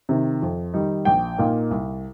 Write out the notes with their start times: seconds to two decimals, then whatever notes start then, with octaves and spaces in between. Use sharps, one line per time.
0.09 C3 D#3
0.42 F2
0.74 D#3 G3 D#4
1.05 A#1 G5
1.38 A#2 A#3 D#4
1.71 C2